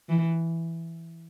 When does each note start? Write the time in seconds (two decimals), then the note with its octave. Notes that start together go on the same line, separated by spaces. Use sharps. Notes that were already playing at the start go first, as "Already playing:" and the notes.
0.09 E3